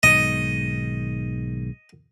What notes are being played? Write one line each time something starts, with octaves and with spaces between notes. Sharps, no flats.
B1 G#2 D#3 D#5